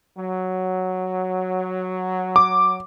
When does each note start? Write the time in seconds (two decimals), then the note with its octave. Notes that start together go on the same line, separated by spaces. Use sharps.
0.18 F#3
2.36 D6